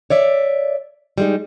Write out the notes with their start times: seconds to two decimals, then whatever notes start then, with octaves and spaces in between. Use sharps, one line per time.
0.10 C#5 D5 E5
1.18 G3 G#3 D#4